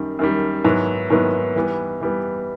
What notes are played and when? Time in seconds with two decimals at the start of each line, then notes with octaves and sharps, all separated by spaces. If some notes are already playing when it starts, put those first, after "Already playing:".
Already playing: F#2 D#3 G3
0.19 F#2 D#3 G3
0.64 G#2 D#3 F#3 B3 E4
1.10 G#2 D#3 F#3 B3 E4
1.56 E3 G3 B3
2.01 E3 G3 B3